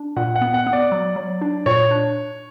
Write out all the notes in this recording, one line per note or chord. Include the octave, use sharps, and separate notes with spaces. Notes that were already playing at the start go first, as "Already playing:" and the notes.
Already playing: D4
A#2 F#5
F#5
B3
F#5
B3
D5
F#3
F#3
D4
A#2 C#5
D4